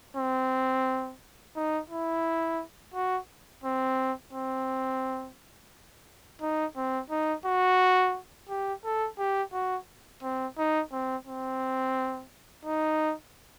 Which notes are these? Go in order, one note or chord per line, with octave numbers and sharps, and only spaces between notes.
C4
D#4
E4
F#4
C4
C4
D#4
C4
D#4
F#4
G4
A4
G4
F#4
C4
D#4
C4
C4
D#4